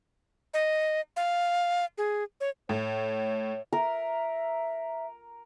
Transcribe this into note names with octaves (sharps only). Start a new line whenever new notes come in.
D#5
F5
G#4
C#5
A2 C#5
A#4 E5